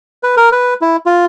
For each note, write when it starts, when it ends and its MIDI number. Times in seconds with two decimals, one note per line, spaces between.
0.23 0.35 71
0.37 0.49 70
0.52 0.74 71
0.81 0.97 64
1.06 1.25 65